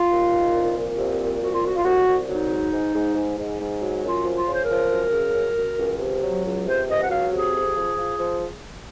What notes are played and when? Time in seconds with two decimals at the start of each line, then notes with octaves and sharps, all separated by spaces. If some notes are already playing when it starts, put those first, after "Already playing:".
Already playing: F4
0.10 D#2
0.32 D#3
0.53 C2
0.74 A#2
0.97 C2
1.19 A#2
1.40 C2 F#4
1.52 F4
1.62 C2 F#4
1.75 F4
1.84 C2 F#4
2.06 C2
2.28 F#3 D#4
2.50 G#2
2.72 G#2
2.94 G#2
3.15 G#2
3.37 G#2
3.59 G#2
3.81 F#3
4.03 F#2 F4
4.25 F3
4.32 F4
4.47 C#3 C5
4.61 A#4
4.69 F3
4.91 F#2
5.12 C#3
5.35 F#2
5.56 F#2
5.78 C#2
5.99 C3
6.22 F#3
6.44 C#2
6.65 C3 C5
6.87 C#2 D#5
6.99 F#5
7.09 F#3 F5
7.31 C3 G#4
7.53 F2
7.75 F3
7.96 F3
8.18 F3